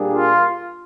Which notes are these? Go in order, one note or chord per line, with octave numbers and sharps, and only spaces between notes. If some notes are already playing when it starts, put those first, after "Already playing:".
Already playing: A#2 G3 A#3 D4 G#4
F4